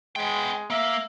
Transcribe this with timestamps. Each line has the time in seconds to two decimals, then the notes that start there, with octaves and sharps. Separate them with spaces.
0.16 G#3 B3 G5
0.70 A#3 E5